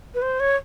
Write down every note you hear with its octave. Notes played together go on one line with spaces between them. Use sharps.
B4
C5
C#5